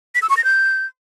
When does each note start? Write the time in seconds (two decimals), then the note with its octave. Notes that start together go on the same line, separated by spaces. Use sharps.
0.15 B6
0.22 E6
0.30 C#6
0.37 A#6
0.44 G6